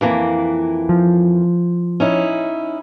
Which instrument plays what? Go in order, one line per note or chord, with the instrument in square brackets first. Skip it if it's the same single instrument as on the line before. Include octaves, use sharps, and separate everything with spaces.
[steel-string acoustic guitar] F2 E3 A#3
[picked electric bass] F3
[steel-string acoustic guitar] C#4 D#4 E4